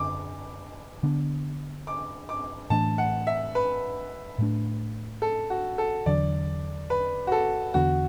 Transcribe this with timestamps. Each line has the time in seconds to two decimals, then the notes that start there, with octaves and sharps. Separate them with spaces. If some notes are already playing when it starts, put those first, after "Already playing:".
Already playing: F#2 D3 D6
1.03 D3 B3 D4
1.87 D6
2.29 D6
2.70 A2 E3 A3 D4 A5
2.98 F#5
3.27 E5
3.55 B4
4.39 A2 A3 D4
5.22 A4
5.50 F#4
5.78 A4
6.06 E2 D3 F#3 D4 D5
6.90 B4
7.27 F#4
7.32 A4
7.74 E2 D3 B3 D4 F#4